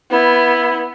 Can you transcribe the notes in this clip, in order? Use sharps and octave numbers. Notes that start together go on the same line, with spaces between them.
B3 E4